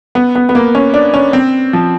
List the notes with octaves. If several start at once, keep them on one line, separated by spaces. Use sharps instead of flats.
B3
B3
B3
A#3
C#4
D4
C#4
C4
F3